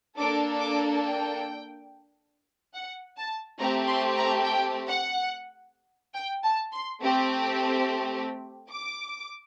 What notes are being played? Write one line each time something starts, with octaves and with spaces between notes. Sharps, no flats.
A#3 D4 A4 D6
D6
G5
F#5
A5
A3 C4 G4 A#5
C6
A#5
G5
F#5
G5
A5
C6
A3 C4 G4
D6